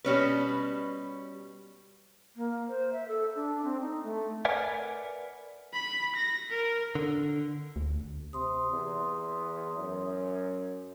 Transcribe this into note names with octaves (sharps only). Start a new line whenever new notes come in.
B2 G3 C#4 B4
A#3
C5
E5
A4
D4
C4
D#4
A3
A#4 B4 D5 E5 F#5 G#5
B5
A#6
A#4
D3
D2
C3 C6 D#6
E2
F#2